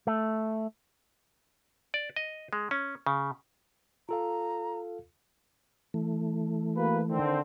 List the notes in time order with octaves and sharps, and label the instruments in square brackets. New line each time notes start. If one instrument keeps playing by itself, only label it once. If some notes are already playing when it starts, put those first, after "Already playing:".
[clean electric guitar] A3
[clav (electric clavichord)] D5
D#5
G#3
C#4
C#3
[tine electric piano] F4 A4 F5 [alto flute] A#5
[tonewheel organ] E3 A3
[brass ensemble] A#3 F#4 B4
D3 D#3 C4